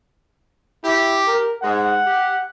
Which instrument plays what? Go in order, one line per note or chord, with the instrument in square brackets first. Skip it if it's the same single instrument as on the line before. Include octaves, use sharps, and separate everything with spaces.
[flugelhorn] E4 [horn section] G4
[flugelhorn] A#4
[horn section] G#2 G#3 [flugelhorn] F#5
[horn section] G4